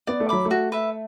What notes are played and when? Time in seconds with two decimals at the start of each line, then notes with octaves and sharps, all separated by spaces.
0.07 B3 D5
0.20 A3
0.29 F#3 B5 D6
0.45 A3
0.51 F#4
0.72 B4 E5